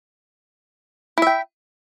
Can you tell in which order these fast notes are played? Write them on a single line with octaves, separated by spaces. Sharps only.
E4 E5 G5